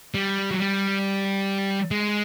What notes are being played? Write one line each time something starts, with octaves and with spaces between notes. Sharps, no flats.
G3
F#3
G3
G#3